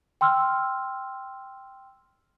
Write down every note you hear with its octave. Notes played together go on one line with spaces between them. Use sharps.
G5 C6 E6 F6